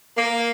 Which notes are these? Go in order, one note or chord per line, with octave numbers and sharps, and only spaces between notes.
A#3